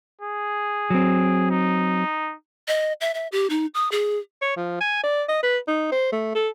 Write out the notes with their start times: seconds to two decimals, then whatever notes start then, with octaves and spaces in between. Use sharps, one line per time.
0.22 G#4
0.90 F#3 C4
1.50 D#4
2.68 D#5
3.01 E5
3.14 E5
3.32 G4
3.50 D#4
3.74 D#6
3.92 G#4
4.42 C#5
4.57 F3
4.81 G#5
5.03 D5
5.29 D#5
5.43 B4
5.68 D#4
5.92 C5
6.12 A3
6.35 A4